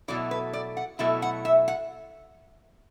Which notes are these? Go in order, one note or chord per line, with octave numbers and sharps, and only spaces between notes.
B2 F#3 A3 E4 D5
B4
D5
F#5
B2 F#3 A3 E4 E5
F#5
E5
F#5